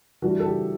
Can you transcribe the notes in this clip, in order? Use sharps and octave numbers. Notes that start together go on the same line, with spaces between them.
E3 G3 D4 F#4
A4
G4